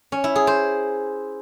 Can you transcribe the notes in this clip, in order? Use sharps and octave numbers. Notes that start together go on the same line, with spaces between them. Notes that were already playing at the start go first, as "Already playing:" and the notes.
C#4
E4
G#4
C5